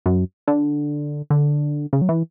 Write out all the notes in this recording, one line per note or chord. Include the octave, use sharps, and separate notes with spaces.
F#2
D3
D3
C#3
F#3
E3